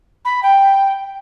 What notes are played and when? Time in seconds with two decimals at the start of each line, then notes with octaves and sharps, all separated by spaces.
0.24 B5
0.42 G5